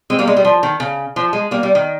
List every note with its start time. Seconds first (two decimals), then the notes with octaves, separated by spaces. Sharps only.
0.10 G#3 C4
0.19 G3 A#3
0.27 G#3
0.37 G3
0.45 F3
0.63 D#3
0.80 C#3
1.16 F3
1.33 G#3
1.51 G3 A#3
1.63 G3
1.75 D#3